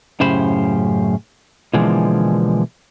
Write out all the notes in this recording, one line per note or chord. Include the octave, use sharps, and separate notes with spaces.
F#2 A2 C#3 G4 C5 B5
B2 D3 E3 F3 G#3 A#3